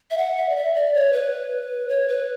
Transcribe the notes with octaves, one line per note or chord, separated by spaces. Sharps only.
E5
F#5
E5
D5
E5
D5
C#5
B4
C#5
B4